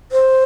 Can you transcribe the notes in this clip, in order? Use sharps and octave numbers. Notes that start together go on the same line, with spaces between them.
C5